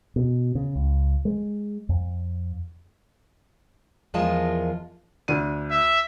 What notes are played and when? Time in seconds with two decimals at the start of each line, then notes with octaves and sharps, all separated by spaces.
0.16 B2
0.55 C#3
0.75 C#2
1.25 G#3
1.89 F2
4.14 E2 F3 G#3 F4 A#4 A5
5.28 D2 D4 D#7
5.71 E5